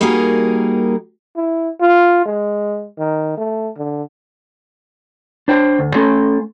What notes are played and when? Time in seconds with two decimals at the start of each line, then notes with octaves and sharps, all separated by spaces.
0.01 G3 A#3 D#4 F#4 G#4 A#4
1.36 E4
1.81 F4
2.26 G#3
2.98 D#3
3.37 A3
3.77 D3
5.48 D4 C5 G5
5.79 D2
5.95 A3 C#4 A4 C6